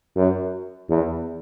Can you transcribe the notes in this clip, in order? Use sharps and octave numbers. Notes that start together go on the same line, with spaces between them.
F#2
E2